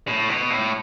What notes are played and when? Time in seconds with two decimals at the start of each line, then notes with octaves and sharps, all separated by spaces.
0.08 A2
0.29 B2
0.50 A2